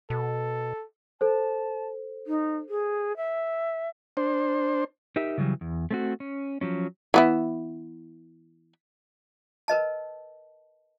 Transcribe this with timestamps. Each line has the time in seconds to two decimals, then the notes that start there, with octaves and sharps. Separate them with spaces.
0.10 B2 A4
1.21 A4 C5 A5
2.27 D#4
2.69 G#4
3.17 E5
4.17 D4 C5
5.16 D#4 G4 A#4 E5
5.38 C#3 E3 F#3 G3
5.61 E2
5.91 A3 C4 F#4
6.20 C#4
6.61 F3 F#3 C#4
7.14 E3 B3 E4
9.68 A#4 B4 D#5 A5